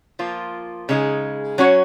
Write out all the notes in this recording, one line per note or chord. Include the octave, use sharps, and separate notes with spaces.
F3 A#3 F4
C#3 G#3 D#4 G#4
F#3 C#4 F#4 C#5